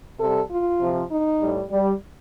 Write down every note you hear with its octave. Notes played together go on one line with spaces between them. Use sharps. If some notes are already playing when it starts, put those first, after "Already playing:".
C3 G3 A4
F4
C3 F3
D#4
A2 G3
G3